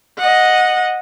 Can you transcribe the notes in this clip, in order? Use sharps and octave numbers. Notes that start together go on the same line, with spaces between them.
D#5 F#5